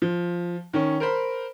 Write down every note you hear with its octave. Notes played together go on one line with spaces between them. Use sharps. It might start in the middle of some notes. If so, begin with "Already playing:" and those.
F3
D#3 C#4
A#4 C5 B5